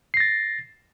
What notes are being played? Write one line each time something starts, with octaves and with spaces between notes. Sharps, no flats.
A6 A#6 C7